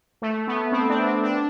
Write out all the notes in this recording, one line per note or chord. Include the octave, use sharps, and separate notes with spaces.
A3
B3
C4
D4
C4
D4